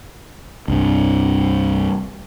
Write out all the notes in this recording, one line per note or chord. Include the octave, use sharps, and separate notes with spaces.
C2 G2 C3